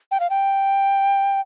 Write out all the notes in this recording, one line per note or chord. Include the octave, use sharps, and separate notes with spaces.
G5
F5
G5